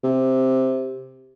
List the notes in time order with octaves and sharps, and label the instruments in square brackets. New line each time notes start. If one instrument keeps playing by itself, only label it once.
[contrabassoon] C3